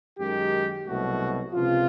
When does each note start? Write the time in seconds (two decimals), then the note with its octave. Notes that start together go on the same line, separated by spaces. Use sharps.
0.18 F#2 D#3 G#3 G4
0.86 C2 B2 F#3 A3 F#4
1.53 C#2 C3 F3 F4